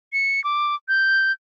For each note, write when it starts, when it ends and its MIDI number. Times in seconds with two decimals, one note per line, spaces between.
0.13 0.43 97
0.44 0.75 86
0.88 1.32 91